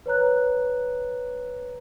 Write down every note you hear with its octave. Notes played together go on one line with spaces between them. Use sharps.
B4 C#5 A#5 F#6